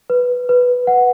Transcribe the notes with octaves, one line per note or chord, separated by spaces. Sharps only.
B4
B4
F#5